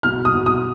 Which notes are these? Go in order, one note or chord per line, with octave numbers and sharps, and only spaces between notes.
B2 F6
D#6
B2
D#6